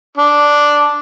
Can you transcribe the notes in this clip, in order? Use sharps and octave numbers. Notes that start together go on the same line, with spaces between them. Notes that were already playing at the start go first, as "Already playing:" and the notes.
D4